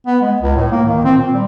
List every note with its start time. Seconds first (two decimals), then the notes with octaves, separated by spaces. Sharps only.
0.06 B3
0.21 G#3
0.42 C#2
0.56 A2
0.71 A#3
0.86 D#3
1.05 C4
1.17 A#2
1.34 G3